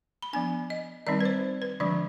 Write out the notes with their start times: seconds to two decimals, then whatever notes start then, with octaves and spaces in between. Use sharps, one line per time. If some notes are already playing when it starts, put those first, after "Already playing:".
0.22 B5
0.33 F3 B3 D4 G#5
0.70 D#5
1.07 D#3 G3 C4 D#4 D5
1.21 B4
1.25 C5
1.62 B4
1.80 D3 F3 G#3 D4 D5